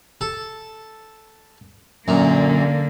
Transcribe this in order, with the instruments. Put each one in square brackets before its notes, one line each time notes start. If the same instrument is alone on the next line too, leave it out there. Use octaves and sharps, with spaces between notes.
[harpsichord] A4
[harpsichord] F#2 A#2 [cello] D3 A#3